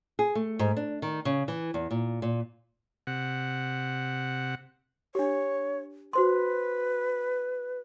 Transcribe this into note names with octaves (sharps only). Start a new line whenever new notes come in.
G#4
A3
G#2
D4
D#3
C#3
E3
E2
A#2
A#2
C3 F#5
D4 G4 C#5
F#4 B4 C5 C6